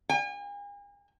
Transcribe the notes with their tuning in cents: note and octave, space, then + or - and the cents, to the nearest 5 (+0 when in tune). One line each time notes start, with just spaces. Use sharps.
G#5 -40